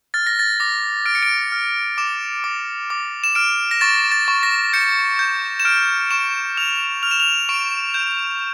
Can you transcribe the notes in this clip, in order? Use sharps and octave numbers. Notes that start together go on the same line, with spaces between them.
F6 A6
A#6
A6
D6 A#6
F6 D7
C#7
D7
F6
D6 E7
D6
D6
E7
F6 D7
A#6
C#6 A6
A6
C#6
A#6
G6 C#7
G6
E7
F6 D7
C#6 E7
F6 F7
F6 F7
E7
F7
C#6 D7
G6